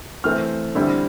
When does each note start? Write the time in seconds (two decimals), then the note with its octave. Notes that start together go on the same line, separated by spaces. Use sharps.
0.24 E3 A3 C4 F6
0.75 D3 G3 C4 E4